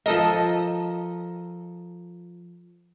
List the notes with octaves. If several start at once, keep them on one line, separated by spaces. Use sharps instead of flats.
F3 A4 A#4 D#5 E6